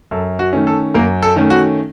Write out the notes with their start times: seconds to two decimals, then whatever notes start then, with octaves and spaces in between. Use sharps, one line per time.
0.11 F#2 A4
0.39 F#4
0.53 D#3 A3 C#4
0.67 A4
0.94 F#2 A#3 A#4
1.22 A4
1.36 D#3 A3 C#4
1.50 F#4